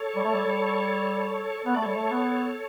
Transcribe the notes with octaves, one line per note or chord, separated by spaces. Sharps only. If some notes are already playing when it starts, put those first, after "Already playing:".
Already playing: A4 C#5
G3
A3
G3
G3
B3 C#5
A3 D5
G3 A4 C#5
A3
B3